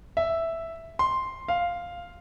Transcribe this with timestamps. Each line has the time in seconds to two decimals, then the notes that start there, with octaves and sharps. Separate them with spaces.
0.17 E5
0.99 C6
1.48 F5